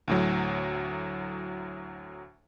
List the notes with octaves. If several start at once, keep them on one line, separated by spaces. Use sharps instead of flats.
D2 A2 F#3